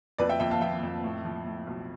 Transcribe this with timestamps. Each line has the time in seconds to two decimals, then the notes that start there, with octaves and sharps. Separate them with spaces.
0.18 F2 B4 D5
0.29 E5 G5
0.40 F2 E5 G5
0.51 F5 A5
0.61 F3 E5 G5
0.83 F2
1.04 A2
1.24 F3
1.46 A2
1.67 B1